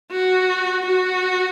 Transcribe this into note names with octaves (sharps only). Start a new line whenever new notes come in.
F#4
F#4